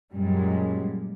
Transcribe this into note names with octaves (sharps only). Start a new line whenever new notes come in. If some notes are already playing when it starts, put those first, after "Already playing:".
F#2 A#2 G3 G#3